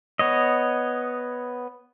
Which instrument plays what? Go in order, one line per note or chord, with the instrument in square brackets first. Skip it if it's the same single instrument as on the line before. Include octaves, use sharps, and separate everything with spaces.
[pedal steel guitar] B3 C#5 D#5